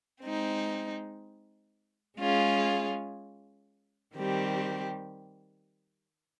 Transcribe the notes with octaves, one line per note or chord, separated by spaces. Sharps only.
G#3 C4 D#4
G#3 C#4 F4 G#4
D#3 G3 C4 G4